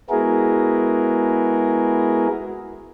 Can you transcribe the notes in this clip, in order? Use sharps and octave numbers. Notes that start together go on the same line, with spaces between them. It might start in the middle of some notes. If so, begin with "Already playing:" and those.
G#3 B3 E4 F#4 G#4 A#4